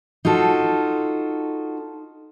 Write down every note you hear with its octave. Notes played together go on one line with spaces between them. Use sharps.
D#4 F4 F#4 A4